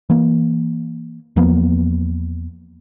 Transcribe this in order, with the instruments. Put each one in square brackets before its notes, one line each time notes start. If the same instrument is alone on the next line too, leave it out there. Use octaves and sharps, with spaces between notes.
[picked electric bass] E3 A#3
E2 F3 A#3 B3